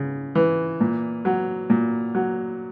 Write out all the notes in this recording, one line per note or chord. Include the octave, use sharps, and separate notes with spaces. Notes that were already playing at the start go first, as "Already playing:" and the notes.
Already playing: C#3
E3
A#2
F#3
A#2
F#3